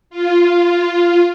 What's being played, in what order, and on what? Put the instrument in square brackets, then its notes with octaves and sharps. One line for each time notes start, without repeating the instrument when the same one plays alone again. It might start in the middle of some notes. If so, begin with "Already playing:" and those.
[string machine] F4